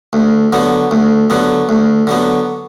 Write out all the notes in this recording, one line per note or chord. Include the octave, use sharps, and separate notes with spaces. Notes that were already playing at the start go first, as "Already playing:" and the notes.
D2
D3 F#3 B3
D2
D3 F#3 B3
D2
D3 F#3 B3